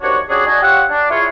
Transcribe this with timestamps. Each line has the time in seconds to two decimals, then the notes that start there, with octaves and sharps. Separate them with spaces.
0.01 D#2 C3 D4 F#4 C#5
0.28 G3 C#4 D4 F#4 G#4
0.46 D4 F#4 D#5 G#5
0.62 F4 G4 C#5 E5 F#5
0.90 D4
1.10 E4 F4 G#4 C#5